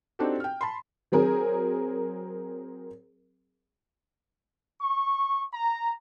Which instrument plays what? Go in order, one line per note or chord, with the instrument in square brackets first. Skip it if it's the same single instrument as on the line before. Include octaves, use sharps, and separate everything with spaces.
[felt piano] C4 D4 D#4 F#4 G4 A4
G5 F6
A5 B5 C6
[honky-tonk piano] F#3 C4 G#4 A#4
[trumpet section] C#6
A#5